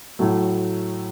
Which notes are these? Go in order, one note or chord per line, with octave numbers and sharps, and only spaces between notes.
A2 F#3 A3